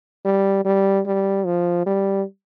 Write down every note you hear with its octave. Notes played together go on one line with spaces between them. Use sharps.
G3
G3
G3
F3
G3